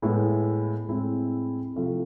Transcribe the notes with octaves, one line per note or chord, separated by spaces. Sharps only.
A2 G#3 B3 E4
A2 G#3 C4 E4
C3 F3 A3 E4